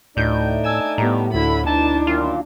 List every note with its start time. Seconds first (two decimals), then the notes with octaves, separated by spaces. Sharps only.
0.17 D2 A2 A3 D4 D#4 G6
0.64 G#5 A5 E6 E7
0.98 A2 G3 B3 A#5
1.33 D2 D3 E4 B5
1.67 B2 D4 D#4 A5
2.07 F#2 A#2 D#3 F4